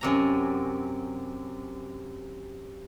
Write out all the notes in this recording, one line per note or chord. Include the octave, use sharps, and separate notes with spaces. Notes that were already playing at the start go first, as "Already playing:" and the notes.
F#2 C3 A#5